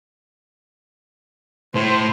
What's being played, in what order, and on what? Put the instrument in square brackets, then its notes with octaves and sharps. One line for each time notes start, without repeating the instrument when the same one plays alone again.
[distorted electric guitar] A2 [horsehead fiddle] C5